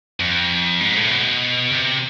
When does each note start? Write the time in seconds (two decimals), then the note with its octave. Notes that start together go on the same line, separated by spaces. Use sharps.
0.20 F2
0.80 G#2
0.96 A2
1.11 B2
1.72 C3